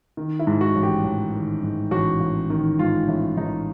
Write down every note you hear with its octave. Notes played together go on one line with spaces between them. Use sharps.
D#3
E4
G#2
F#4
A1
G4
A1
D#3
G#2
A1 F#4
A1
D#3
G#2 F4
A1 E4
A1 D#4